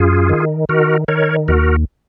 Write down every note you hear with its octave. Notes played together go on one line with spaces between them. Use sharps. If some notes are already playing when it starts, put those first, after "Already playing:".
Already playing: F#2 F4 G#4
D#3
D#3 F#4 A#4
D#3 A#4 C#5
D#2 F#4 A#4